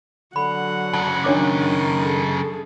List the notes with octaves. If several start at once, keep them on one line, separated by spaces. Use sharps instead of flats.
D3 F#3 F#5 B5
F#2 C#3 A5
D#3 D4 C#5 D6
G#4 A4